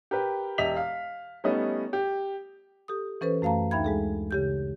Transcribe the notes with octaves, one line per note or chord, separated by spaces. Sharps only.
G4 A#4 B4 G5
E1 G4 D#5 E5 B6 F7
F5
G3 A3 B3 C#4 D#4 D#5
G4
G4 A4 D#6
E3 C#4 A4 B4 C5
F#2 A3 F5 A5 A#5
D2 D#4 E5 G5 B5 G#6
G#3 G#4 A4
C#3 G4 G6